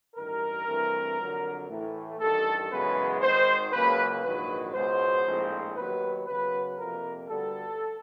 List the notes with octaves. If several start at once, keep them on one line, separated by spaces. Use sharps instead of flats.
A1 G2 D#3 A#4
G2 E3 A3 C4
F2 D3 F#3
A2 E3 A3
A1 G2 D#3 A4
F#2 C#3 E3 G#3 B3 B4
G#1 G#2 D#3 G#3 C5
C#2 C#3 F#3 A#3 B4
A#1 G#2 D#3 F#3 B4
C#2 B2 G#3 B3 C5
A#1 A2 F3 G#3 C4
D#2 D#3 F#3 B3 B4
F#2 C#3 F#3 B3 B4
F2 C3 F3 A#3 A#4
D2 D3 G3 B3 A4